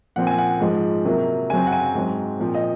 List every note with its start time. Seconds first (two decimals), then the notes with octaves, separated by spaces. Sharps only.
0.16 A#2 F3 C4 F#5
0.27 G#5
0.38 F#5
0.61 G#2 F3 G#3
1.05 C3 F#3 A#3
1.50 F#2 C#3 F#3 C4 G#5
1.67 F#5
1.72 G#5
1.95 G#2 F#3 C4
2.40 A#2 F3 C4
2.54 D#5